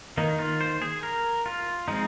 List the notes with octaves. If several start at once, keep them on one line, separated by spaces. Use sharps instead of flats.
D#3 A#3 D#4
F4
C5
G#4
A#4
F4
F3 G#3 C4 D#4